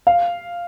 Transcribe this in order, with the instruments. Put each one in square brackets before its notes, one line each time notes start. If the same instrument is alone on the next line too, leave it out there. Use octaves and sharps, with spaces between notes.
[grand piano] F5